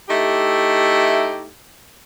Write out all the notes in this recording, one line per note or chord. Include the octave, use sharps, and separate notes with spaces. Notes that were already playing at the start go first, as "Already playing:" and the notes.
A3 D#4 E4 G4